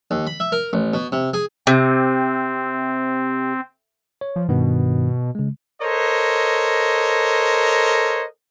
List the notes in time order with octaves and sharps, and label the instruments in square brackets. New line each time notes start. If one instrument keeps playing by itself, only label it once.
[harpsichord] D#2
B5
E5
A#4
A1
B2
C3
G#4
[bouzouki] C3 [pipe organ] C4
[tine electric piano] C#5
[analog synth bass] F3
[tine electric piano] G2 D#3 B3 [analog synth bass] B2
[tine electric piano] C#3 G#3
[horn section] A4 A#4 C5 C#5 D#5